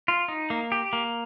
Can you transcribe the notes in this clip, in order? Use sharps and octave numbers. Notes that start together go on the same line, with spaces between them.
F4
D#4
A#3
G4
A#3